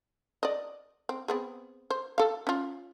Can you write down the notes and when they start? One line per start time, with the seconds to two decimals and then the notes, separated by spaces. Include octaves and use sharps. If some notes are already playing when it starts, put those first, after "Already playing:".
0.43 D5 D#5
1.09 C4
1.28 B3 C4 G#4
1.90 C5
2.18 A4 F5
2.47 C#4 F4